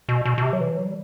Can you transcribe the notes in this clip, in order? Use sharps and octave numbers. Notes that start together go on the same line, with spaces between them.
B2
B2
B2
C3
F#3
E3
F#3
G3